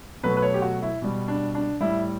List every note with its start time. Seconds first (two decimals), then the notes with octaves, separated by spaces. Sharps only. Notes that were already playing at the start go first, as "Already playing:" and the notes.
0.23 B2 F#3 A3 B4
0.37 B4
0.42 C#5
0.54 G4
0.62 F#4
0.82 E4
1.02 B2 G3
1.28 D4
1.55 D4
1.80 A2 G3 E4